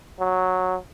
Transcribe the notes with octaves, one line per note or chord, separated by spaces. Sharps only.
F#3